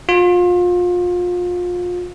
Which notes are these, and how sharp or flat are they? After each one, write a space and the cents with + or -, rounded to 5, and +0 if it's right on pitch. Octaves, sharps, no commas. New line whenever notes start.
F4 +30